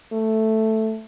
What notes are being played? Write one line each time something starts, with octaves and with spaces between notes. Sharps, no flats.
A3